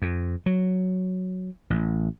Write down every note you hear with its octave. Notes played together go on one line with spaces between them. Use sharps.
F2
F#3
A1